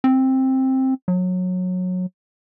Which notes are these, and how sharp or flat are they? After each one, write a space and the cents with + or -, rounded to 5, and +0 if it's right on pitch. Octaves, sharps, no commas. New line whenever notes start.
C4 +10
F#3 -20